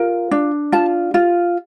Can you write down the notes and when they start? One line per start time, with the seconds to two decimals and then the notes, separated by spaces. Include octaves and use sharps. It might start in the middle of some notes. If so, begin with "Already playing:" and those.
Already playing: F4 A#4
0.31 D4
0.72 F4 A5
1.14 F4